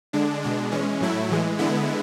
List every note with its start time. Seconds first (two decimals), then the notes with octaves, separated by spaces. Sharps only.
0.13 D3 G#3 D4
0.42 B2 G#3 D4
0.71 E3 G#3 C#4
1.00 A2 F#3 A3 E4
1.29 A2 E3 G#3
1.59 D3 G#3 B3 E4